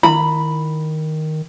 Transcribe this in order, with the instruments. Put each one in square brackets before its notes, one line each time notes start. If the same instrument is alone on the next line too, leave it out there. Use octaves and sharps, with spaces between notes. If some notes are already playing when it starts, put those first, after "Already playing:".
[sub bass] D#3 [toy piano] E4 [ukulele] B5